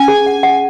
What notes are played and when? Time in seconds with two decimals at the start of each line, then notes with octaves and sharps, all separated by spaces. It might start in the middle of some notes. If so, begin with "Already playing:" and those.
Already playing: C#4 G#5
0.08 G#4
0.26 F#5
0.43 F#5